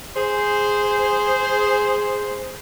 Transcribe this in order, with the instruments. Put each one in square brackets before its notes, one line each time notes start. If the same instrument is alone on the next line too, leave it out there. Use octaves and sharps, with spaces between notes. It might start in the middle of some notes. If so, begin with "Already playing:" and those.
[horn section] G#4 C5